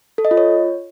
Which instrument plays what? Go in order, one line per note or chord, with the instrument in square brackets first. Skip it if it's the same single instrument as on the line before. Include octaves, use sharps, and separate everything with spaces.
[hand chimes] A4
D#5
F4
C#5